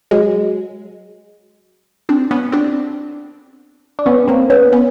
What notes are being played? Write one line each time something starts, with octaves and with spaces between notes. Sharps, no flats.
F#3 G#3
C4 D4
B3 C#4
C4 D4
D4
B3 C#4
A#3 C4
B3 C#4
B3 C#4